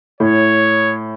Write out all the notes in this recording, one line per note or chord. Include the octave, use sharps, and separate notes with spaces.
A2 C#5